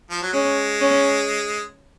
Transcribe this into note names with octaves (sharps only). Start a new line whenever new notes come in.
F3
F#3
G#3 C#4
C#4